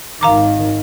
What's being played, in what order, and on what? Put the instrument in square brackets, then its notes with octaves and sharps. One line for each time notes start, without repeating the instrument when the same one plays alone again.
[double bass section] G#1 D#3 [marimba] F5 A#5 D6